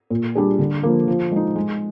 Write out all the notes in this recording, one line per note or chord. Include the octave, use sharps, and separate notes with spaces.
A#2
G3 D4 G#4
D3
F3 A#3
F3
G#3 D#4
G#3